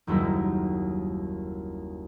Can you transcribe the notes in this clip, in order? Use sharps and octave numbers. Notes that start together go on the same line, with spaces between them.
F#1 D#2 F#3 G3 E4 A#4